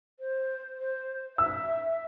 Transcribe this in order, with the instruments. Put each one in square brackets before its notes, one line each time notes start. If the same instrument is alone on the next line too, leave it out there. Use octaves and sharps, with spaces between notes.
[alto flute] C5
C5
[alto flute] E5 [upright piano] E6